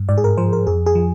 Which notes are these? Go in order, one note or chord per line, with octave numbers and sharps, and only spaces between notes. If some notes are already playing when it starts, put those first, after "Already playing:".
Already playing: G2
G#2 D5
G#4
A#4
F3 C5
A#4
F2 G#4
G#4
F3